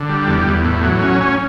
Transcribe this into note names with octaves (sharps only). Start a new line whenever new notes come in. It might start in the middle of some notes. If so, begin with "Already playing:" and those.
Already playing: D3
G3
E2
E2
A2
F#3
C#4
C#4